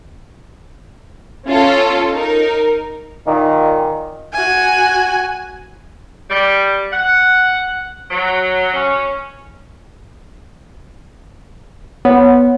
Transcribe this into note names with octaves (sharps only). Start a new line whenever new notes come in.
C#4 F4 A4
D#4 A#4
A#2 D#3
F#4 G#5
G3
F#5
F#3
C#4
B3 C#5